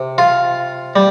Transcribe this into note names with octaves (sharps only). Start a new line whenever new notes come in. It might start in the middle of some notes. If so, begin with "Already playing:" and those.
Already playing: C3
F4
G3